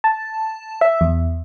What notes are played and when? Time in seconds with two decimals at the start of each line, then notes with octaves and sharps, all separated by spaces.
0.04 A5
0.81 E5
1.01 E2